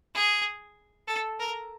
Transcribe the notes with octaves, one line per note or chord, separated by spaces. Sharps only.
G#4
A4
A#4